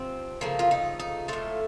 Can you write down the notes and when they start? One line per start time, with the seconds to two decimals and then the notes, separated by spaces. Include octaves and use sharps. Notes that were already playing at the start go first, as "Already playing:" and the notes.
Already playing: C3 F3 C4
0.41 C#3 F3 A3 A#3
0.59 F4
0.71 D#4
1.00 D#4
1.28 A2 A3 F4